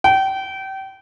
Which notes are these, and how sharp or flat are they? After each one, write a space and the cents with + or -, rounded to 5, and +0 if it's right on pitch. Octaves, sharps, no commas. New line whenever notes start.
G5 -30